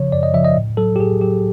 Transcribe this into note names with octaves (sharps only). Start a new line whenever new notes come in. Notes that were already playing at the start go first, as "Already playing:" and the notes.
Already playing: C#3 F3 C#5
F#2 D5
D#5
C#3 F3 E5
D#5
A2
F#3 A4
G4
A2 G#4
F#3 G4